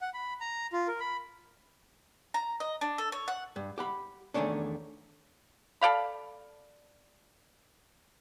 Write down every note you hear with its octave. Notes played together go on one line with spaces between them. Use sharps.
F#5
B5
A#5
F4
A#4
B5
A#5
D#5
D4
A4
C#5
F#5
G2
G4 F#5 B5
E2 D#3 A3 C#4 D4
A4 D5 F5 B5